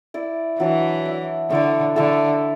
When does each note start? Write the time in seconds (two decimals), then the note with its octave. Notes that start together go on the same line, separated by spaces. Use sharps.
0.14 E4 D5
0.60 E3 F#3 D4 F#4
1.05 E4 D5
1.50 D3 A3 E4 D5
1.96 D3 A3 E4 A4 E5